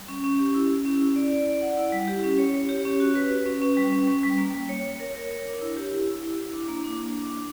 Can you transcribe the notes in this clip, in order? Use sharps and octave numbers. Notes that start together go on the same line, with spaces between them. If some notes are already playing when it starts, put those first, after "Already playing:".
Already playing: G3
C#4
C#4
G4
E4
C#4
C#4
E4
D5
D5
D5
F#5
E4
G3
G4
C#4
C#5
C#5
G4
C#4
F#4
B4
B4
C#4
C#4
G3
C#4
C#4
G3
A#3
G3
C#5
C#5
A#4
A#4
C#5
D4
E4
G4
E4
E4
E4
E4
D4
A#3
D4
D4
D4
D4